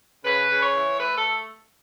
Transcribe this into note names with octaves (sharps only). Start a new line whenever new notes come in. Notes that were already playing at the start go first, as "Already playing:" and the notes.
C#3 B4
C#3
C#5
E3
A3 B4
A4